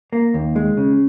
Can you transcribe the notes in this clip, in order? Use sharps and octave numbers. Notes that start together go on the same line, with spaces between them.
A#3
D#2
G#3
C#3